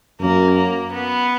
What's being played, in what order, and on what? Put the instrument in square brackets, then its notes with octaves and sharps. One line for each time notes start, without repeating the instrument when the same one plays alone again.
[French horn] F#2 [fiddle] A#3
[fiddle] A#3
B3